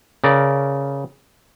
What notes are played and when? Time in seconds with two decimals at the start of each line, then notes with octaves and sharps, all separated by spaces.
0.24 C#3 A#4 D5